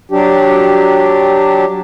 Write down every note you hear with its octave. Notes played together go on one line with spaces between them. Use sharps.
F#3 D4 G4